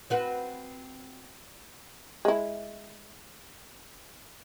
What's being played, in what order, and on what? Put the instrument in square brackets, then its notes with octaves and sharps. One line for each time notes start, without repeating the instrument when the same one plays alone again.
[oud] C4 F#4 B4
[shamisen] G#3 E4